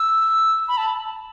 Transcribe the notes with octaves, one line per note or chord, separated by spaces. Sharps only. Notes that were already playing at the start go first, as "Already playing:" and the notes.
Already playing: E6
B5
A5